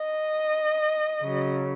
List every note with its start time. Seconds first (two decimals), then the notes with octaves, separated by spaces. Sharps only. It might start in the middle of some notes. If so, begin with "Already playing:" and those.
Already playing: D#5
1.22 C#3 F#3